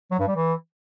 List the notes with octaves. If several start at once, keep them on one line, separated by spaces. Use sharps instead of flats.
F#3
G2
G3
E3